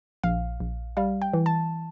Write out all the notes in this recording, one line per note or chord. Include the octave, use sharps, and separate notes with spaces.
A#1 F5
A#1
G3 F5
G5
E3
A5